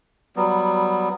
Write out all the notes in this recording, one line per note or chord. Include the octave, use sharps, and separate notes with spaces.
F#3 G3 B3